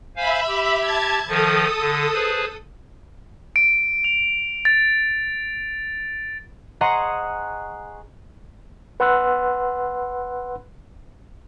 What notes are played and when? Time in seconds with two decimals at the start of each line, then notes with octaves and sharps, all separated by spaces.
0.16 C5 E5 F5 G#5 B5
0.48 G4
0.80 A5 G#6
1.28 D#3 F3 A4 D#6
1.79 D3
2.13 G#4 B4 C5
3.56 D7
4.04 F7
4.65 A6
6.81 G#4 C5 D#5 F#5 A#5 C#6
9.00 B4 F#5 C6 E6 F#6